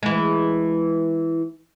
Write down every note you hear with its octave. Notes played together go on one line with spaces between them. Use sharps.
E3 G#3